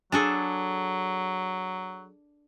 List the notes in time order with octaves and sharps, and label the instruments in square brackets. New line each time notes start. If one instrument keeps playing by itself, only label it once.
[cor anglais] F#3 [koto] D4 G#4 A4